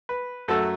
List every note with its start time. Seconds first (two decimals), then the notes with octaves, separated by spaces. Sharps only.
0.09 B4
0.48 F#2 F#3 A3 A4